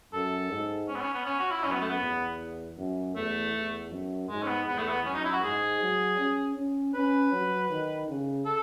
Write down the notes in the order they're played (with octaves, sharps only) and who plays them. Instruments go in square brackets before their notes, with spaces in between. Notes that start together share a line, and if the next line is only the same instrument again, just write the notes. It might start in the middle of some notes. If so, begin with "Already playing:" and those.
[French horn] F#2 [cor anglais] A4
[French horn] G#2
[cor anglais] C#4
B3
C#4
B3
C#4
F#4
E4
[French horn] F#2 [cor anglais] C#4
[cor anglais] B3
A3
B3
[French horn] E2
F#2
[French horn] E2 [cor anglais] A3
[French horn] E2
F#2
[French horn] G#2 [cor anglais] G#3
[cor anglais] C#4
B3
[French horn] E2 [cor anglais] B3
[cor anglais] A3
B3
[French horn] F#2 [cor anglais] C#4
[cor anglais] D#4
E4
F#4
[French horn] G#2 [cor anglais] G#4
[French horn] F#3
C#4
C#4
[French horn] C#4 [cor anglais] B4
[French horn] F#3
D#3
C#3
[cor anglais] A4